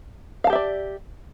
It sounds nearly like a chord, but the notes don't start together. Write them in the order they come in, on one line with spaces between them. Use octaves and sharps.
F5 A5 G4 E5 D5